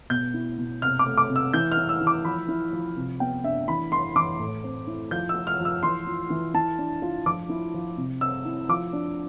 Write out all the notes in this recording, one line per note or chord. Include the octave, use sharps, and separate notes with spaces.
B2 G6
E4
B2
C3 F6
D6
A3
D6
C3
E6
E3 G6
F6
E4
E6
E3
D6
F3 B5
E4
F3
C3
B3 G5
D4 E5
E3 B5
E4 C6
E3 D6
A2
C4
E4
F3 G6
E6
F4
F6
F3
E6
E3 C6
F4
E3
E3 A5
D4
F4
F3 D6
E4
F3
C3
C4 E6
E4
F3 D6
D4